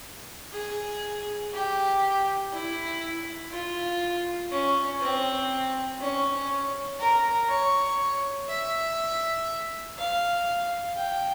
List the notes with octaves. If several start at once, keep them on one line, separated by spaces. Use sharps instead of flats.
G#4
G4
E4
F4
C#4
C4
C#4
A#4
C#5
E5
F5
G5